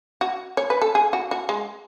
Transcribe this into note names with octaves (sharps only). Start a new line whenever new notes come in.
F#4
C#5
B4
A4
G#4
F#4
F#4
G#3